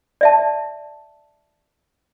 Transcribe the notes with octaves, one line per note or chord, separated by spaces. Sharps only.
D5 E5 A5